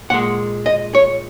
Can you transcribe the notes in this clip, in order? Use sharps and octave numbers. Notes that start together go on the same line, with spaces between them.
A#2 G#3 F#5
D#5
C#5